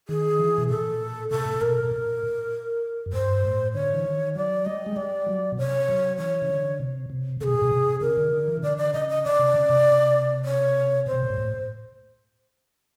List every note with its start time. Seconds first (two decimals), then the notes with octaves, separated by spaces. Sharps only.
0.08 D#3 G#4
0.39 E3
0.58 B2
0.69 A#2 A4
1.31 C3 A4
1.45 A2
1.53 A#2
1.61 B2 A#4
1.84 B2
1.91 A#2
3.06 F#2
3.13 G2 C5
3.43 A2
3.74 D3 C#5
3.94 E3
4.05 D#3
4.35 F#3 D5
4.66 G3 D#5
4.86 G#3
4.96 G3 D5
5.26 F#3
5.52 B2
5.58 C3 C#5
5.88 F#3
6.18 E3 C#5
6.42 C#3
6.49 D3
6.80 C3
7.10 C3
7.41 C3 A4
7.44 B2 G#4
7.55 A#2
7.62 B2
7.71 C3
8.01 C#3 A#4
8.17 D3
8.32 D3
8.48 E3
8.57 C#3
8.63 D3 D5
8.77 D5
8.93 C#3 D#5
9.09 D#5
9.24 D5
9.39 C3
9.54 C#3
9.69 C3
10.45 C#5
11.06 B2 C5
11.22 A#2
11.30 G#2
11.37 A2